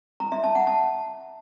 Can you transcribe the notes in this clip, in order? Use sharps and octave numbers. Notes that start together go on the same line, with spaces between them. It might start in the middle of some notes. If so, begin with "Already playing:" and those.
A#5
E5
A5
F#5
A5